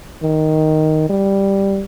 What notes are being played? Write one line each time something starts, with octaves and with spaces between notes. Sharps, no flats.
D#3
G3